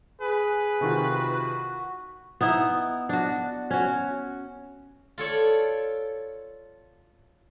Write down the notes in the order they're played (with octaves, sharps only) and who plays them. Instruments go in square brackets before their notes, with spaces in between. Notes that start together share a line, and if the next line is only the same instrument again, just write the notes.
[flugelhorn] G#4 [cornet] B4
[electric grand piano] C3 D#3 F4 [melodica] F#4
[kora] B3 D#4 E4
D4 F#4
C#4 F#4
[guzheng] F4 A4 C#5 D5